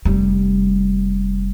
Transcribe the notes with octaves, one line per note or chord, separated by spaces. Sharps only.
F1 G3